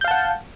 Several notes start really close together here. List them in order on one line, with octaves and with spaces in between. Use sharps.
G6 F5 A5 F#5